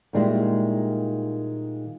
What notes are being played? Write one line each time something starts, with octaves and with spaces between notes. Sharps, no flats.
A#2 D#3 G3 G#3 E4 E5